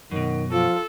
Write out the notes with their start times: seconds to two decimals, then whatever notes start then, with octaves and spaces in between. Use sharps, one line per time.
0.11 F#2 B2 D#3
0.52 F3 F4 A4